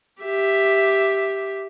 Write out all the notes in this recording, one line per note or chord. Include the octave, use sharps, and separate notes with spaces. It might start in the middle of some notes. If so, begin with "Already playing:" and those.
G4 E5